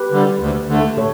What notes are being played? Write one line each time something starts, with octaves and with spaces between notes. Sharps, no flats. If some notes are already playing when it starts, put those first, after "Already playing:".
Already playing: G4 B4
D3 G3
D2
D3 A3
A4 C#5